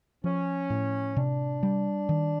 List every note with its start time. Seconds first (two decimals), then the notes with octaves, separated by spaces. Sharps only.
0.24 F3 C#4
0.70 A2
1.16 C3 D4
1.63 G3
2.09 D#3